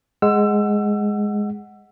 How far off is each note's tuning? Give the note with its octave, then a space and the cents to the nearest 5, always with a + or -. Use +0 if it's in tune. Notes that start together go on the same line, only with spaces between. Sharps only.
G#3 +0 F#5 +0 E6 +25